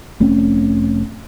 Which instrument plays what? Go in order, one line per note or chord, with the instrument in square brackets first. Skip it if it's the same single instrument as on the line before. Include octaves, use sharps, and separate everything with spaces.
[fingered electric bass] F1 A3 C4 C#4